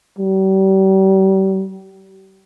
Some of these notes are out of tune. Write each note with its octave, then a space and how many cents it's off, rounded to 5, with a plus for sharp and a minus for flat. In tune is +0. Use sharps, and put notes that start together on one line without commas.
G3 -35